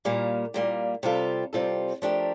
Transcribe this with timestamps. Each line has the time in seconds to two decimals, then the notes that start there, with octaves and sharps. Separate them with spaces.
0.05 A#2 G3 A#3
0.54 A#2 G3 A#3
1.03 C3 G3 C4 F4 A4
1.53 C3 G3 C4 F4 A4
2.02 F3 A3 D4 G4 A#4